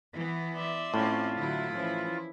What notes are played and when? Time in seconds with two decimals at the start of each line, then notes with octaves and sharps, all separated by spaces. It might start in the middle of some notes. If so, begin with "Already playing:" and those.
0.13 E3 B3
0.56 D5 E5 C6
0.94 A2 C4 C#4 F4
1.37 D3 F#3 E4
1.72 E3 F3 C#4